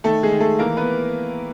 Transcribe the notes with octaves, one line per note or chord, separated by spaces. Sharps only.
D#3 A3 A4
G#3 G#4
D#3
A3 A4
E3 A#3 A#4
B3 B4